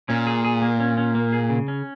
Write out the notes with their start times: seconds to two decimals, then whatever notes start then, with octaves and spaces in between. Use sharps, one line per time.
0.09 A#2 C#4
0.27 G#4
0.44 G#4
0.62 A#3
0.80 C#4
0.97 C#4
1.15 A#3
1.33 G#4
1.50 C#3
1.68 C#4